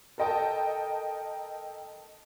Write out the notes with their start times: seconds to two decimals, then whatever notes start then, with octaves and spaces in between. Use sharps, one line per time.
0.18 A4 A#4 D#5 G5 A5